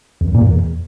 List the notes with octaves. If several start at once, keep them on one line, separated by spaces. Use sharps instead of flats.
E2
F#2
A#2
E2